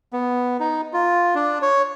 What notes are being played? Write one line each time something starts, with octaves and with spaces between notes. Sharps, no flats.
B3
D#4
F4
D4
C#5